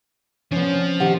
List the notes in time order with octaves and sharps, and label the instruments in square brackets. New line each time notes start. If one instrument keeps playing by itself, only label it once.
[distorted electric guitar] F3 [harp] B3 C#4
[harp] C4
[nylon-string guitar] D#3 G4 F#5